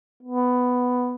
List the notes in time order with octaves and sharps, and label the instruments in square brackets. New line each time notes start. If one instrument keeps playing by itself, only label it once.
[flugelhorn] B3